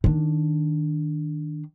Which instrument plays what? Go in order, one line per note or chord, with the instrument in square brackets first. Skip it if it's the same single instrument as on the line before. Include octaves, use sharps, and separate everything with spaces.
[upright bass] D#3 D4